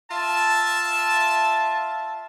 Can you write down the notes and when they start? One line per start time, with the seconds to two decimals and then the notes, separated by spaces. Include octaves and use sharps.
0.10 F4 E5 A5